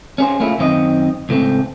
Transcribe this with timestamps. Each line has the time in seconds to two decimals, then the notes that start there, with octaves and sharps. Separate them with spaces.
0.18 C#4 G#4 C5
0.40 A3 A#3 C#4 E4 F4
0.59 F#2 D#3 C4 C5 D#5
1.29 C#2 A2 A3 C4